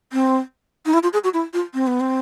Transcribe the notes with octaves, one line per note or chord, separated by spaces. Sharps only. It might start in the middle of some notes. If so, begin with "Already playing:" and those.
C4
D#4
E4
F4
G#4
F#4
E4
F4
C4
B3
C4